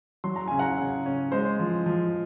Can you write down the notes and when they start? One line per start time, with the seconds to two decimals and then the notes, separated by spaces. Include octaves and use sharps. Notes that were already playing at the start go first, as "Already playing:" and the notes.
0.24 F#3 C6
0.36 A#5
0.48 C#3 G#5
0.59 F#5 A#5
0.78 C#3
1.06 C#4
1.32 G#3 C5
1.59 F3
1.86 F3